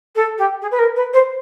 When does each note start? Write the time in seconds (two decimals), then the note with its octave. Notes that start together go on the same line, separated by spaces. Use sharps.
0.16 A4
0.38 G4
0.62 G#4
0.71 B4
0.79 A#4
0.96 B4
1.14 C5